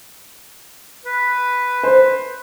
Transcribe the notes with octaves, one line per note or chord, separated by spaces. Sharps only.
B4
C5